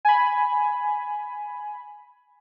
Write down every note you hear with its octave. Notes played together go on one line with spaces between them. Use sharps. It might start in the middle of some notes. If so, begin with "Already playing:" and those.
G#5 B5